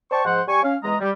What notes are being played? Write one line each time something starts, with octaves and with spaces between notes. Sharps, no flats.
C5 D5 G5 A5 C#6
G#2 F3 C5 F#5
G3 G#5 C#6
C#4 F5
E2 G#3 D#5 A#5
G3